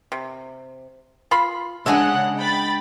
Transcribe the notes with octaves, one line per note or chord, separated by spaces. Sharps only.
C3
F4 B5 C6
C#3 G#3 D4 D#5 E5 F#5 G#5
G5 B5 A6